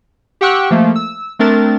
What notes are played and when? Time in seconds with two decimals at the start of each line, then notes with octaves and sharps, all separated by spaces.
0.41 G4 F#5 G5 C#6 E6 F#6
0.71 F3 A3 A#3
0.96 E6
1.39 A3 C4 D4 A#4 A6